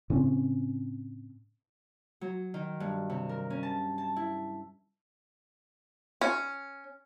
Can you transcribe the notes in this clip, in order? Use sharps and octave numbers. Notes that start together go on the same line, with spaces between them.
A2 C#3 C4 C#4
F#3
D#3
G2
C3
A#4
C#4
A5
A5
E4
C#4